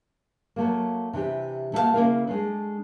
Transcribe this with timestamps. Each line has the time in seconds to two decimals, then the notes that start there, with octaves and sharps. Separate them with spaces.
0.56 F#3 A3 A#3
1.13 C3 E3 D4 G4
1.73 A3 A#3 F#4 G4 F5 A5
1.94 C#3 G#3 A#3 E4 A#4
2.27 G#3 A3 D4